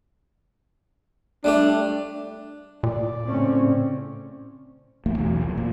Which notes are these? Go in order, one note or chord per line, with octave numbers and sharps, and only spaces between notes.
G3 A3 D4 G4
A#2 D5
A2 C#3 A3 C4 C#4
A1 D#2 A3 A#3
B1 E2
D#2 F3
G1 A#2 A#3